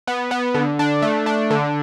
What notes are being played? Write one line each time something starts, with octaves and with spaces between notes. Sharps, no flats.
B3
B3
D3
D4
A3
D4
D3